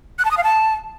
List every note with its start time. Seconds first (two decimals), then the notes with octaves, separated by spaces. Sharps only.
0.19 F#6
0.25 A5
0.31 D#6
0.37 F5
0.44 A5